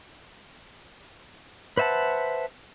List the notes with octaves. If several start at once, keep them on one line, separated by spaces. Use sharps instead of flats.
B4 C5 E5 F#5 A5